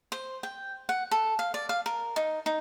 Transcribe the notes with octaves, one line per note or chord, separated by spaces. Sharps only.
C5
G5
F#5
A4
F5
D5
F5
A#4
D#4
D#4